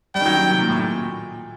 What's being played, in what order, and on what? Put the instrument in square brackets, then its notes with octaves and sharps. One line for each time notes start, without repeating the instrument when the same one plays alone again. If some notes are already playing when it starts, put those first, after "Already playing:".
[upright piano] G3 [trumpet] G5
[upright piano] D#3
F#3
D#3
C3
A#2
A2
A#2